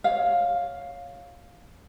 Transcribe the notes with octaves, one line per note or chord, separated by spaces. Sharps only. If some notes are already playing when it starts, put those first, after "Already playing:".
C#5 F5